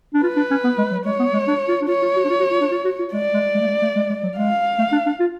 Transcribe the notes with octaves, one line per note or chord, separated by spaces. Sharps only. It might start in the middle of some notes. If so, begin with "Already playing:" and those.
D4
F4 B4
D4
C#4
B3
G#3
F#3
G#3 C#5
B3
G#3
D4
F4
D4
F4 C#5
F4
F#4
D4
F4
F#4
F4
D4
F4
F#4
F4
G#3 D5
G#3
G#3
A3
G#3
A3
G#3
G#3
F#3
G#3 F5
A3
D4
D4
F4